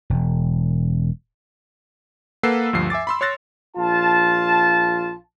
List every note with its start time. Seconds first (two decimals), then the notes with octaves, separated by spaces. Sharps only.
0.10 E1
2.43 A#3 A4 B4 F#5 E6 C7
2.73 D2 G2 F3 C7
2.90 E5 G#5 D6 A6
3.07 B5 C6 E6
3.21 C#5 C6 F#6 A6 A#6
3.77 A#1 F4 A5